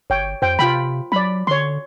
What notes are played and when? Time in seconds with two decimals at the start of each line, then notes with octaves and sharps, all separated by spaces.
0.10 G1 C#5 G5
0.42 F2 C5 G5
0.59 C3 F4 G5 B5
1.12 F#3 D5 B5
1.47 D3 C#5 C6